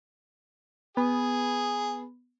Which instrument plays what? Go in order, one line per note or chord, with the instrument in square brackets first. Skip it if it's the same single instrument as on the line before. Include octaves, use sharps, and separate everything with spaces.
[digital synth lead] B3 [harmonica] G#4